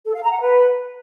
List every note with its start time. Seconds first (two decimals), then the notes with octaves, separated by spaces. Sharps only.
0.05 A4
0.14 F5
0.23 A#5
0.32 F#5
0.41 B4